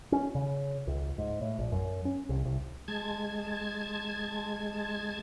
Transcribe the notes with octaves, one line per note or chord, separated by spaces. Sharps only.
C#4
C#3
C#2
G#2
A2
A#1
F#2
C#4
C2
C2
G#3 A5 G#6